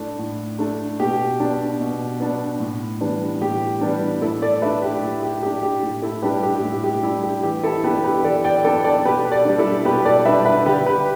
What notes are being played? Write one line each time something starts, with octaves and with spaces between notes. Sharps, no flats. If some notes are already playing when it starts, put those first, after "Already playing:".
Already playing: A2 A3 D4 E4
A2
A3 D4
B2 G4
B3 D4
B2
B3 D4
A2
E3 G3 B3 D4
A2 G4
E3 G3 B3 D4
A2 E4 A4
A4 D5
A3 D4 B4 E5
G4
A2 E4
G4
A3 D4 G4
G4
A2
E4 A4
G3 D4 G4 B4
G4
G4
A2 E4
G4
G3 D4 E4
G4
E3 G4
E4 A4
B3 D4 G4 B4
G4 B4
E3 A4 D5
D5 G5
B3 D4 A4 D5
A4 D5
B2 G4 B4
A4 D5
G3 D4
E4 A4
B2 G4 B4
A4 D5
G3 D4 B4 E5
B4 E5
D3 G4 B4
G4 B4